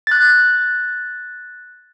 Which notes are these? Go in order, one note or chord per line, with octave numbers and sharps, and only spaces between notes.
F#6 A6